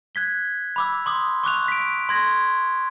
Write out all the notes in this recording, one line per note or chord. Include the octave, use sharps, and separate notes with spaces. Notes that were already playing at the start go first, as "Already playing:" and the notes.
F#6 G#6 B6 G7
B5 D6 E6
C6 D6 D#6
C#6 D6 F#6 F7
B6 D7
C6 G#6 A#6